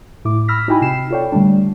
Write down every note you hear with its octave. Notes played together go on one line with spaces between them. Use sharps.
A2 E4 D6
B5 E6 F6 A#6 B6
D#4 E4 F#4 G5 G#5 B5
C3 G5 C7 E7
F4 A4 C#5 D5 G5
D3 G3 A3 D4